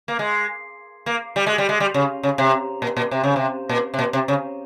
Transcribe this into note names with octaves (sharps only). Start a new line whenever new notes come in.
A#3
G#3
A#3
G3
G#3
G3
G#3
G3
C#3
C#3
C3
A#2
A#2
C3
C#3
C3
A#2
C3
A#2
C3
C#3